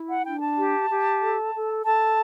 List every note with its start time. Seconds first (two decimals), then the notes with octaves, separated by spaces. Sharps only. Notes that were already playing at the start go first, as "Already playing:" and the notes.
Already playing: E4
0.10 F#5
0.25 D4 G5
0.41 A5
0.57 G4
0.90 G4
1.21 A4
1.54 A4
1.85 A4 A5